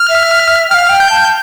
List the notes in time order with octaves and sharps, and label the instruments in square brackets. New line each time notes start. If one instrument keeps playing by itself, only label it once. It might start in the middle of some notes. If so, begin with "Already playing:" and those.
Already playing: [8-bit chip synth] F6
[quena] E5
[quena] F5 G5 [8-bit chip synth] F6
[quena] G5
[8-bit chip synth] G6
[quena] A5